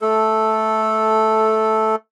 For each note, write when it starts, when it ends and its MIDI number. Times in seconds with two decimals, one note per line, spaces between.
0.01 1.96 57
0.01 1.96 69